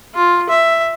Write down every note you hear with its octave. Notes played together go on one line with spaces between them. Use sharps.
F4
E5